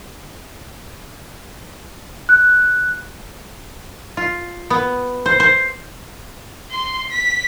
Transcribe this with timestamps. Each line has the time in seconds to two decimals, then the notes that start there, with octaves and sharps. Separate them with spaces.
2.29 F#6
4.17 F4
4.70 B3
5.26 C5
5.40 C5
6.71 C6
7.11 B6